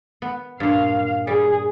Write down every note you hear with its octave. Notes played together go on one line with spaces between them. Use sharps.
B3
G2 A#2 F5
G3 G#4